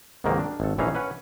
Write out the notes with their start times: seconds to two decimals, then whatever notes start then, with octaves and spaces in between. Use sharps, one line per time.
0.24 C#2 G#2 C3 D#3 F#3 A#3
0.39 D4
0.60 G#1 A4
0.78 A#1 E3 C#4 D#4 F5
0.95 C#4 B4 F#5